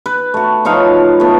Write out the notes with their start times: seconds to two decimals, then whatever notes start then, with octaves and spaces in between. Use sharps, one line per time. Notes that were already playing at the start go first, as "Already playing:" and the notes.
0.06 B4
0.34 A3 F#4
0.65 F3 D#4 C#5 F5
1.20 A3 B3